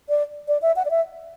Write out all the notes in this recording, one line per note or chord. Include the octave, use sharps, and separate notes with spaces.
D5
D5
E5
F#5
D5
E5